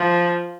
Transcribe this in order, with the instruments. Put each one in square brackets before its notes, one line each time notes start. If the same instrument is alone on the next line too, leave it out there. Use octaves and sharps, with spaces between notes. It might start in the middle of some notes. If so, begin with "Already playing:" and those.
Already playing: [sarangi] F3